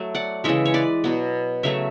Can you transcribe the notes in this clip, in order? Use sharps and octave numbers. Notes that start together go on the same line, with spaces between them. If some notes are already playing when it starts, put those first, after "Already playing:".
Already playing: F#3 A3
D5 F#5
C#3 E3 G#3 C#5 E5
C#5
B4 D5
B2 F#3 B3
C#3 F#3 A3 C#5 E5